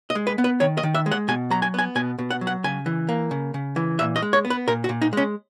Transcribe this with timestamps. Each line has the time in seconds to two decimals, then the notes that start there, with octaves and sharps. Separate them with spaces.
0.10 D#5
0.15 G#3
0.27 B4
0.38 B3
0.44 B4
0.60 D#3 C#5
0.77 D#5
0.83 D#3
0.94 E5
1.06 G#3
1.12 F#5
1.28 B2 G#5
1.50 F#3 A#5
1.62 G#5
1.74 B3 G#5
1.95 B2 G#5
2.19 B2
2.31 F#5
2.41 F#3
2.47 F#5
2.64 C#3 G#5
2.86 E3
3.09 A#3
3.31 C#3
3.54 C#3
3.76 E3
3.99 A#2 E5
4.16 D#5
4.22 G#3
4.33 C#5
4.45 B3
4.50 B4
4.68 A#2 A#4
4.84 F#4
4.89 A#2
5.02 D#4
5.13 G#3 C#4